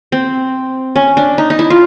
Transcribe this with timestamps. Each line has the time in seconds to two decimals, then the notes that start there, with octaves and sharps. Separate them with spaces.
0.12 C4
0.96 C#4
1.17 D4
1.38 D#4
1.50 D#4
1.59 E4
1.70 F4